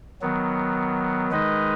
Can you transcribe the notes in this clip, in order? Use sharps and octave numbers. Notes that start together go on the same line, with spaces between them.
D#3 F#3 B3
D#3 G#3 D#4 B4 D#5